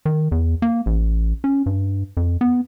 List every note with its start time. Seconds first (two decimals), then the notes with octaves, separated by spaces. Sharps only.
0.06 D#3
0.32 E2
0.62 A#3
0.86 A1
1.44 C#4
1.66 G2
2.17 F2
2.41 B3